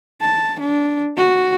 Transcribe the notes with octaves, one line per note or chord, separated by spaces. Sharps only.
A5
D4
F#4